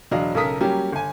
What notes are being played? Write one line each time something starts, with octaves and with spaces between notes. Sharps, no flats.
E1 F#3 D4 D#5 F5
B1 C#3 A4 A#4 D#6 B6
F#3 G3 A#3 C#4 G4
G1 G#5